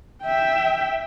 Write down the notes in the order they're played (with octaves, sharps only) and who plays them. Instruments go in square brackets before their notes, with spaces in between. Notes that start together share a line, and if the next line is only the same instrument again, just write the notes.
[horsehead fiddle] E5 G5